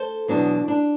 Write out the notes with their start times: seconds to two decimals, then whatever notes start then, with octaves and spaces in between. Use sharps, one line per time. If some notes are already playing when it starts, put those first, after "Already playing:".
Already playing: A4 C5
0.28 E2 B2 F#3 D4
0.68 D4